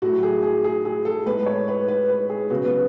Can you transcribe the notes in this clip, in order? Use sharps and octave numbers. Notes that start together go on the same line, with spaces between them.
A2 F#3 A3 F#4
G#4
G#4
G#4
G#4
A4
A2 G#3 B3 B4
C#5
B4
B4
B4
G#4
C#3 F#3 B3 F#4
B3